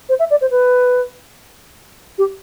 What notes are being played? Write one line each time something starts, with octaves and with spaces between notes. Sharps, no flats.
C5
E5
D5
C5
B4
G4